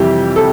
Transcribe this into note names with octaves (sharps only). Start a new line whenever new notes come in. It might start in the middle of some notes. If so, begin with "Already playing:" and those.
Already playing: F2 C3 E3 G3 G4
A4